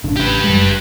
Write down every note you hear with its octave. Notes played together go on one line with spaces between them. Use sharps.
A1 C#3 D4
G4 B4
F#1 G3 G#3